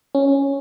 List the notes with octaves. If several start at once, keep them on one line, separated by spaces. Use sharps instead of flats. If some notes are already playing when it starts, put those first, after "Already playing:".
C#4